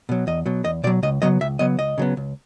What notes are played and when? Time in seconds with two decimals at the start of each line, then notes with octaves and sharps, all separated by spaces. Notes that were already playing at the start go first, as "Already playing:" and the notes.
0.09 B2 F#3
0.27 E2 D#5
0.46 B2 F#3
0.65 E2 D#5
0.84 B2 D5
0.87 F#3
1.03 C#2 D#5
1.22 C#3 F#3 B3 D#5
1.41 C#2 E5
1.59 C#3 F#3 B3 D#5
1.78 C#2 D#5
1.98 C#3 F#3 B3
2.17 C#2